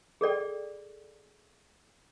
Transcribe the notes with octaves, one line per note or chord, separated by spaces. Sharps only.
G#4 A4 D5 G5